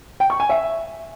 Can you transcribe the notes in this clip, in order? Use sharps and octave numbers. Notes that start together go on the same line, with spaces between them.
G5
C#6
G#5
E5